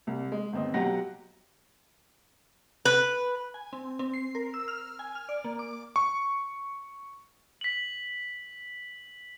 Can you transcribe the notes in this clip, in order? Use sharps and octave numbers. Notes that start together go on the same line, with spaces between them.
C2
G#3
G1 D#2 C4 D#5
B1 F#3 G4 F#5 A#6
B4
G#5
C4
C4
C7
A#4
E6
F6
G#5
F6
D5
A#3
D6
C#6
B6 F#7